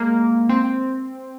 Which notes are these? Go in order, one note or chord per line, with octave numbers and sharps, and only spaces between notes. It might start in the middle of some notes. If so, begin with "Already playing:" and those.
Already playing: G#3 A#3
C4